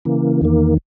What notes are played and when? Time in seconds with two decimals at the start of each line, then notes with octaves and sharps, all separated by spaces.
0.05 C#3 E3 A#3
0.41 E2 D#3 A#3